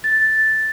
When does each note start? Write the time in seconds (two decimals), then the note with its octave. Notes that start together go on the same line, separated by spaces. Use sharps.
0.04 A6